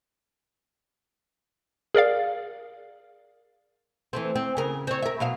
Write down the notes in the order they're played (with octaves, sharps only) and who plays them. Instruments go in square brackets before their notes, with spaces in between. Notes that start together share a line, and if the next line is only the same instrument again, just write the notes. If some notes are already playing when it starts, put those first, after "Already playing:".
[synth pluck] G#4 A#4 D5 F5
[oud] E3 A3 C4
C4
C#3 A#4
C4 C#5
A#4 E5
B2 F#3 F5